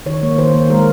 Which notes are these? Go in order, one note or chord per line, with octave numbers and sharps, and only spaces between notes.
D#3 C#5
A#3
D#3 C5
A#3
G#3 A#4